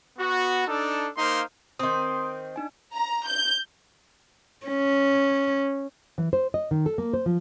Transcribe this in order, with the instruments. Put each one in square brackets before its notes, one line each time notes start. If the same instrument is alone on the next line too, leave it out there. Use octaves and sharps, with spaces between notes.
[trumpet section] B3 F#4
D4 D#4 A4
A#3 D#4 C5 F5 C6
[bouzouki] D#3 C4 [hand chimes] C6 D#6
[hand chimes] D4 D#4 G#5
[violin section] A#5
G6
[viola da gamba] C#4
[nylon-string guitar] E3
C5
D#5
D#3
A4
A#3
C5
F3